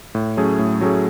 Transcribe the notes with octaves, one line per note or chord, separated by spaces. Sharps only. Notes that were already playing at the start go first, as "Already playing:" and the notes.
A2
F#3 A3 C#4 G#4
A2
F#3 A3 C#4 G#4